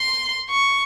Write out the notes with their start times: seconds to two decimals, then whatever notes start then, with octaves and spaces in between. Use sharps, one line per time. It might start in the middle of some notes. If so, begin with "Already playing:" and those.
Already playing: C6
0.50 C#6